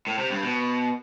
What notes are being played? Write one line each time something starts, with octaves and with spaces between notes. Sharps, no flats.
A2
C3
G2
B2